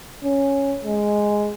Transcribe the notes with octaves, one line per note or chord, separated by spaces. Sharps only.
C#4
G#3